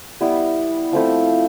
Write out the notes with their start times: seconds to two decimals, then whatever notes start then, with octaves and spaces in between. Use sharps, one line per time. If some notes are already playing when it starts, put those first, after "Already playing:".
0.20 G3 B3 E4
0.92 F3 A3 C4 E4